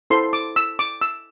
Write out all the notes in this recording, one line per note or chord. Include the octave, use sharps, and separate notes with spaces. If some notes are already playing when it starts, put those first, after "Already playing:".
E4 A4 C5 C6
D6
E6
D6
E6